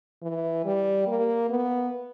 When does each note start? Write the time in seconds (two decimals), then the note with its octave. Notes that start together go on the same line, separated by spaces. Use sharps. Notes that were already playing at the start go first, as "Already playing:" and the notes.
0.23 E3
0.65 G3
1.07 A#3
1.50 B3